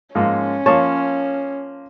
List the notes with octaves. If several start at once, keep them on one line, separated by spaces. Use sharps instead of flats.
G#2 F3 A#3 C#4
F3 A#3 C#5 A5